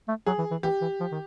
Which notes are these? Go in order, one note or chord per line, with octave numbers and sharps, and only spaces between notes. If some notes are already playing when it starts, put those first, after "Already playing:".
A3
F#3 G#4
E3
E3
E3 G4
E3
F3
D#3